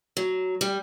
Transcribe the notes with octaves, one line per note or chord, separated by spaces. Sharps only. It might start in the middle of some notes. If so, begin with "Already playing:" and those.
F#3
G3